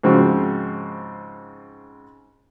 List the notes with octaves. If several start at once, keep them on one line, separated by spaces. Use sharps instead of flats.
G#2 C#3 F3 C4 F#4